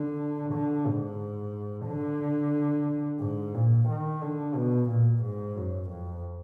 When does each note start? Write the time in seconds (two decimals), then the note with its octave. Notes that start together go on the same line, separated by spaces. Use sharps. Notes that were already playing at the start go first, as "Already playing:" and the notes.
Already playing: D3
0.53 D3
0.87 G#2
1.87 D3
3.21 G#2
3.54 A#2
3.88 D#3
4.22 D3
4.55 B2
4.89 A#2
5.23 G#2
5.56 F#2
5.90 F2